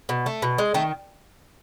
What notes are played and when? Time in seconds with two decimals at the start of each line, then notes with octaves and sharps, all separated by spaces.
0.09 B2
0.26 A3
0.42 B2
0.58 G#3
0.74 D#3 A3